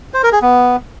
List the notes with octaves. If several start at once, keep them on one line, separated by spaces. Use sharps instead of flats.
C5
A#4
G#4
B3